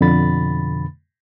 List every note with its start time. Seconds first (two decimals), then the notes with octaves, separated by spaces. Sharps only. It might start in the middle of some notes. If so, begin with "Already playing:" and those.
0.01 F2 B2 D3 B5 A6